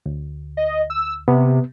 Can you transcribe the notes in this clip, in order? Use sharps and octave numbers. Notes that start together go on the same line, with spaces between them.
D2
D#5
E6
C3 B3